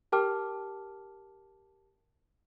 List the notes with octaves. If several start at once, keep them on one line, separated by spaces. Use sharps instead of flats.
G4 A#4 G5 A5 D6 F6